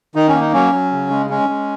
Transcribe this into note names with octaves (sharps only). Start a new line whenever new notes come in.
D#3 D#4
C#4
A#3
D#4
F#3 C#4
F#3
C#3
G#3
G#3 C#4
G#3